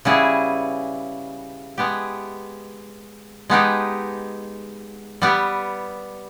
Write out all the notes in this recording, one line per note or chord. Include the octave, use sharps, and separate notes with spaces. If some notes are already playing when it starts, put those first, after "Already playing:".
C#3 G3 B3 E4 G#4
G#3 B3 G4
G#3 B3 D#4 G4
G3 B3 G4